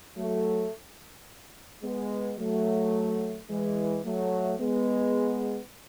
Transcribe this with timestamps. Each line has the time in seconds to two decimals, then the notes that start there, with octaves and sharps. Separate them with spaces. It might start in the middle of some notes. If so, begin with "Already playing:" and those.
0.18 F#3 A3
1.84 G#3 B3
2.39 F#3 A3
3.50 E3 G#3
4.05 F#3 A3
4.60 G#3 B3